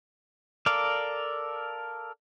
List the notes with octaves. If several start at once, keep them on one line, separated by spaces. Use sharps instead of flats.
A4 A#4 D5 F5